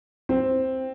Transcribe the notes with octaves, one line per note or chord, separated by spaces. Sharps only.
C4